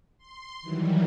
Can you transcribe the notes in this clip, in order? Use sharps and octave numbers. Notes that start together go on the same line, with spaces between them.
C6
D#3 E3 F#3 G3